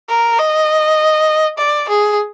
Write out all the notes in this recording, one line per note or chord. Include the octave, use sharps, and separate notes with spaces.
A#4
D#5
D5
G#4